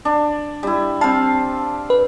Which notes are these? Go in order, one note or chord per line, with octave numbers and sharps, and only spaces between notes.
D4
G3 E4
C4 F5 A5
B4